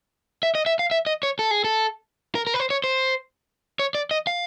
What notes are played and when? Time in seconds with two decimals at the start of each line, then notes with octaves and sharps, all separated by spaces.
0.43 E5
0.55 D#5
0.66 E5
0.79 F5
0.91 E5
1.07 D#5
1.23 C#5
1.39 A4
1.51 G#4
1.64 A4
2.35 A#4
2.47 A#4
2.54 B4
2.60 C5
2.70 C#5
2.84 C5
3.79 C#5
3.95 D5
4.11 D#5
4.27 F5